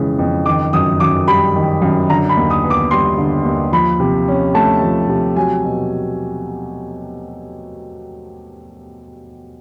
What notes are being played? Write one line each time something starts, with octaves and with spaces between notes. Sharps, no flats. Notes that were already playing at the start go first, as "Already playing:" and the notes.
Already playing: F2 C#3 E3 G#3
F2
D#3 D6
F#2 D#6
F#2 D6
G3 B5
D#3
F#2
D3 A#5
B5
D#2
D#6
B3
D6
G3 C6
D3
D#2
F3 B5
C3
C#4
A3 A5
F3
C3
F#3 G#5
B2